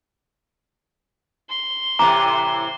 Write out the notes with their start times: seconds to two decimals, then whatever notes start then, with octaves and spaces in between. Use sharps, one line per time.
1.50 C6
1.99 A2 C3 E3 A#5 D6